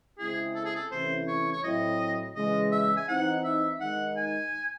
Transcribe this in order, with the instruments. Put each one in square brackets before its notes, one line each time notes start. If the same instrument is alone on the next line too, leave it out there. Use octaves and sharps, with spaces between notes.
[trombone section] C#3 G#3 C4 E4 [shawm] G#4
[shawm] A4
G#4
A4
[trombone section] C3 E3 A3 C#4 E4 [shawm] C5
[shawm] C#5
C#5
[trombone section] A2 F#3 C4 E4 [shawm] D#5
[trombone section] C#3 E3 G#3 [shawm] D#5
[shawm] E5
G#5
[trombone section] E3 C4 D#4 [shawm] F#5
[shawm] E5
[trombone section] D#3 G#3 D#4 [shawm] F#5
[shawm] G#5